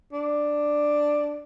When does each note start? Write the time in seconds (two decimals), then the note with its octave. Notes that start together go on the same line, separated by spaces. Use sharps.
0.12 D4